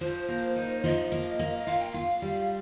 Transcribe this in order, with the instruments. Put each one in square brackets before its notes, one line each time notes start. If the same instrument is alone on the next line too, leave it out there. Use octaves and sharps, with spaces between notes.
[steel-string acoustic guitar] F3 [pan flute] C5
[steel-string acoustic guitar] A#3
D#4
[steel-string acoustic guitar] F3 [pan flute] D#5
[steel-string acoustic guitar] A#3
A#3
[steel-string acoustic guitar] F4 [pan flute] F5
[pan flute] G5
[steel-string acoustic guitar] F4 [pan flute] F5
[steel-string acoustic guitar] G3